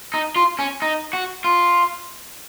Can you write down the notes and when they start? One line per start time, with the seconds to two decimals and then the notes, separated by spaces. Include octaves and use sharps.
0.14 D#4
0.36 F4
0.59 C#4
0.82 D#4
1.13 F#4
1.44 F4